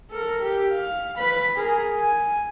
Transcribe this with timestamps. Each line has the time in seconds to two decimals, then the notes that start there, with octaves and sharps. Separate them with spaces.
0.10 A4 A#4
0.42 G4
0.72 F5
1.17 B4 B5
1.55 G#4 A#4
1.93 G#5